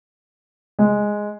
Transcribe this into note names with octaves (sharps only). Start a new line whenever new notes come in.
G#3